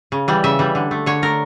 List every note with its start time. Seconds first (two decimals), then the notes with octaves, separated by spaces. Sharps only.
0.12 C#3
0.28 E3 G3
0.44 C#3 E5
0.59 E3 G3
0.75 D3
0.91 A3
1.06 D3 C#5
1.22 A3 A#4